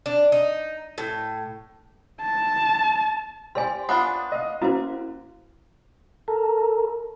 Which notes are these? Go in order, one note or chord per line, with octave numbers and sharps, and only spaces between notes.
D4
D#4
A2
A5
G4 C5 D5 G#5 C6
B3 D4 F4 F#5 D#6 F#6
D#5 F5
A#3 C#4 E4 F#4 C5
A4 A#4